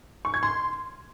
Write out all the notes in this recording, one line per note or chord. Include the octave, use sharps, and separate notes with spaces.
C#6
G#6
C6